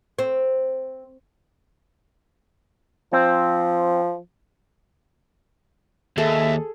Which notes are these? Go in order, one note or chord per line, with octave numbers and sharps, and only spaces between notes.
C4
F3 C4
D#2 G#4 A4 E5